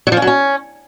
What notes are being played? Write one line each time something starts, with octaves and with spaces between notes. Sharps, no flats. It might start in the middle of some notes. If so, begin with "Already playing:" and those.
F#3
F3
C#4
F#3
C#4